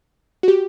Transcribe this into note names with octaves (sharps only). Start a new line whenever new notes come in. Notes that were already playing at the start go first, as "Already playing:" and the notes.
F#4
G4